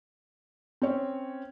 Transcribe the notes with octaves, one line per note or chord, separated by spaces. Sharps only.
C4 C#4 C#5